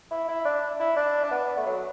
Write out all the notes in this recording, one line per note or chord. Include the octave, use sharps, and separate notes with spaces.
E4
E4
D4
E4
D4
D4
B3
A3
F#3